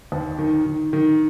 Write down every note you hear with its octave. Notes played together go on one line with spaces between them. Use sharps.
D#2
D#3
D#3
D#3